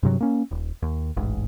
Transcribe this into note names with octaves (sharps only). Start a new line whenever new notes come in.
G2 C3 F#3
A#3 C#4
D#1
D#2
E1 A1 G#2